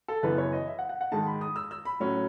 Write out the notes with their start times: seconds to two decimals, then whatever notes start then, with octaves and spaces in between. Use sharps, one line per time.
0.08 A4
0.23 F#2 C#3 E3 B3 B4
0.38 C#5
0.52 D#5
0.68 E5
0.79 F#5
0.89 F#5
1.01 F#5
1.12 G#2 D#3 G#3 D#4 A5
1.26 B5
1.41 D#6
1.56 E6
1.71 E6
1.85 B5
2.00 A2 F#3 C#4